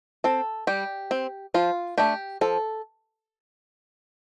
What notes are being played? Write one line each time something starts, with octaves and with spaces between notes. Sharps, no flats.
C4 A4
G3 G4
C4
F3 F4
A3 D4 G4
F3 A4